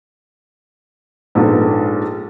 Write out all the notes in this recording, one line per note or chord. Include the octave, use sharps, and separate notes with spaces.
A#1 G#2 B3 A4